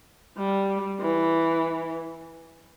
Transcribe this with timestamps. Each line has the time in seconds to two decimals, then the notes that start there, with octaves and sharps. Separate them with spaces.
0.38 G3
1.00 E3